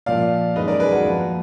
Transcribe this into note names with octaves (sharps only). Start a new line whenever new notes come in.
A#2 F3 A#3 D5 F5
F#2 D#3 G#3 B4 D#5
A#4 D5
G#4 B4
F#4 A#4
F2 F3 A#3